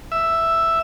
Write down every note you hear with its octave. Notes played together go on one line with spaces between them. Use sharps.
E5